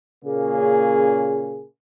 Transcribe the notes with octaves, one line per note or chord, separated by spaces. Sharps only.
A#2 C#3 A#3 C#4 G#4